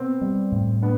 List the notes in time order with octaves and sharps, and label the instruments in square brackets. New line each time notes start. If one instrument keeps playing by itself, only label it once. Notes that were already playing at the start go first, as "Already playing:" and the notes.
Already playing: [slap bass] B2 B3 [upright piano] C4
[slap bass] G3
A2
[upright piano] B3 [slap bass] D4